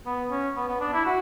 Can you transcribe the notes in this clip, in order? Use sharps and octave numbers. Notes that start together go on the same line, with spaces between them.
B3
C#4
B3
B3
D4
E4
F#4